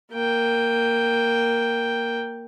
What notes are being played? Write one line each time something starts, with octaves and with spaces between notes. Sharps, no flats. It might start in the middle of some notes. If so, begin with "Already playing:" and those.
A#3 G5